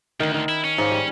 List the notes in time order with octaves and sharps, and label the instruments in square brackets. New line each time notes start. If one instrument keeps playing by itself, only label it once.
[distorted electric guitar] D2 [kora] D#3
[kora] D#3
[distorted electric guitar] E4
C#4
[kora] G#2 C#5 F5
G3